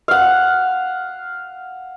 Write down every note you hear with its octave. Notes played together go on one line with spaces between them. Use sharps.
F5 F#5